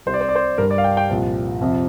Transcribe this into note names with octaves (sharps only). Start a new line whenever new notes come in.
C2 C3 G3 C5
D5
C5
D5
C5
G2 G3 A#4
D5
F5
G5
G5
C2 A#2 F3
F2 C3 F3